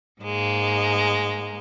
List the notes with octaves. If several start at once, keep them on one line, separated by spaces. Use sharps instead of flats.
G#2 G#3 A#3